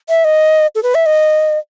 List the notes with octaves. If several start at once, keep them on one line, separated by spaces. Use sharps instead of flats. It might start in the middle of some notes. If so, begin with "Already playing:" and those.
E5
D#5
A4
B4
E5
D#5